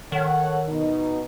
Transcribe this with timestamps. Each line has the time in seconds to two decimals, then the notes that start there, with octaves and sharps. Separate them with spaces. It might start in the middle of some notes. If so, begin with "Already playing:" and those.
0.12 D#3 A4 C#5 F#5
0.68 B2 D#4